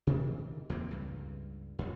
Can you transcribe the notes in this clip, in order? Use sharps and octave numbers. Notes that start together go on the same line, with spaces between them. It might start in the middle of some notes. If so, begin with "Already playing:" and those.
C3 D#3 E3
E2 E3 A#3 C4
C#2 G2
A1 F2